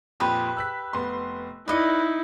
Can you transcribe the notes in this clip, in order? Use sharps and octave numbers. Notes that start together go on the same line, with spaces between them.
F2 A#2 G4 B4 C6 D#6
E6 F#6 B6
F1 B3 C6
D#4 E4 B4 D5 D#5 C#7